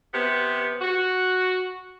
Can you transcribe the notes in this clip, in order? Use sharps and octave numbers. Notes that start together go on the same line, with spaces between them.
C3 B3
F#4